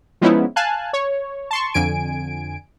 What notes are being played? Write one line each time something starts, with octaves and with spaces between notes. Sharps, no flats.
F3 G#3 B3 C#4 D#4 E4
F5 G#5 A5 F#6
C#5
A5 C6 C#6
F2 D3 G#5 D7